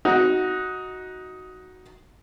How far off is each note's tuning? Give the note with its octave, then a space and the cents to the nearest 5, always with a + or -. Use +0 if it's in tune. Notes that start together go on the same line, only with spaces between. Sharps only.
D#4 +10 F#4 +0